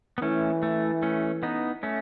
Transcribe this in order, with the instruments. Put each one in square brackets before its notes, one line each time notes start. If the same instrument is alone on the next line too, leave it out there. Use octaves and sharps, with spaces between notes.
[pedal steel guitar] B3
[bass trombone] E3 [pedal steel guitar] A3 C#4
[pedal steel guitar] A3
A3 C#4
B3 D#4
A3 C#4